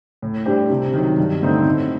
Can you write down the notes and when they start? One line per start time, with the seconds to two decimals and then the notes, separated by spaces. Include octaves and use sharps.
0.22 A2
0.46 G3 D4 G4 C5
0.70 C3
0.94 D#3 F#3
1.17 G2
1.41 D3 A3 C4 D#4
1.65 A2